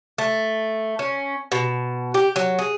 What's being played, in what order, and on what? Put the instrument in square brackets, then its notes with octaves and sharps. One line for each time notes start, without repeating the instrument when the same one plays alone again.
[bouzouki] A3
C#4
B2
G4
F#3
G#4